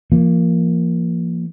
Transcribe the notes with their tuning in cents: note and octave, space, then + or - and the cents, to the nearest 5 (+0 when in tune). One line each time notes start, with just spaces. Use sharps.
F3 -30 A#3 +0